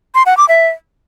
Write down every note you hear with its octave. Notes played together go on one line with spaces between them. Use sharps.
C6
F#5
D6
E5